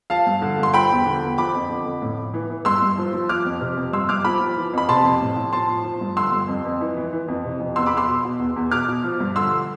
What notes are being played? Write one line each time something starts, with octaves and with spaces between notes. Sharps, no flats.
F3 F5 A5
G2
D3
G2 C6
F3 G5 B5
E2
D3
E2
F3 B5 D6
F2
D3
F2
A2
A2
E3
E3
G2 C6 E6
G2
F3
F3
F3 D6 F6
F2
C3
F2
G2 C6 E6
G2 D6 F6
F3 B5 D6
F3
E3
F2 B5
C3 A5 C6
F2
A2
A2
F3 A5 C6
F3
F3
G2
D3 C6 E6
G2
F2
F2
E3
E3
E3
F2
C3
F2
E2 C6 E6
B5 D6
E2 C6 E6
B2
B2
E2
E2
B2 D6 F6
B2
F3
G2
D3 C6 E6